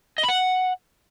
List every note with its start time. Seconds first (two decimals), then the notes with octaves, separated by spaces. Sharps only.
0.18 D#5
0.23 B5
0.29 F#5